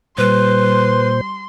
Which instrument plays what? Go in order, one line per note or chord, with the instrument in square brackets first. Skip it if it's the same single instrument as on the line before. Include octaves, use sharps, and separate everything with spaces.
[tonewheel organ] A#2 C5 [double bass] G3 [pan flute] B4 [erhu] C6